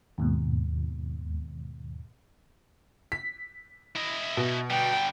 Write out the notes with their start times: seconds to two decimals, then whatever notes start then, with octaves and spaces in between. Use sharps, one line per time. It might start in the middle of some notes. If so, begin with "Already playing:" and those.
0.18 D#2 G#2 B2
3.12 B6
3.95 E4 D#5
4.37 B2
4.70 D3 G3 G5